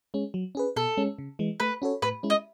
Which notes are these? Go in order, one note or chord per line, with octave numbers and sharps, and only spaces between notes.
G#3 C#4
F#3
C#4 G#4 B4
B2 A4
G#3 C#4
C#3
E3 G#3
A3 B4
C#4 F#4 A4 C#5
A2 B4
G#3 C#4 E4
D#5